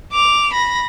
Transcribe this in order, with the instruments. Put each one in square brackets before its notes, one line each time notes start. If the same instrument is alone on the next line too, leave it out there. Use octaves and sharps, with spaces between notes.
[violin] D6 F7
B5 A#6